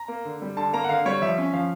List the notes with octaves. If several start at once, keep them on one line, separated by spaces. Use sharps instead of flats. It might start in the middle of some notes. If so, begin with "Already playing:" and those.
Already playing: A#5
A#3
D3
G3
D3 A5
A#3 A#5
F#5
D3 F5
G3 C#5
F3 E5
C#4
F3 F5